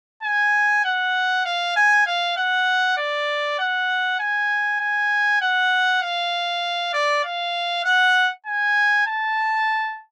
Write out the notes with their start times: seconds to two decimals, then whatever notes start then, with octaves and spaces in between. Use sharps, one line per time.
0.23 G#5
0.85 F#5
1.45 F5
1.76 G#5
2.06 F5
2.37 F#5
2.97 D5
3.59 F#5
4.19 G#5
4.80 G#5
5.41 F#5
6.02 F5
6.93 D5
7.24 F5
7.85 F#5
8.46 G#5
9.07 A5